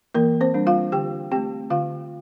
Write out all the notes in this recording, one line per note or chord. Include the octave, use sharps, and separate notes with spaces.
E3 A#3 A#4
C4 C5
G3 D4
F4 F5
D3 G4 G5
A3 C4 G4 G5
D3 F4 F5